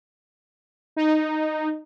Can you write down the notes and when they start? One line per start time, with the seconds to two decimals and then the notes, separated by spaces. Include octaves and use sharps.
0.96 D#4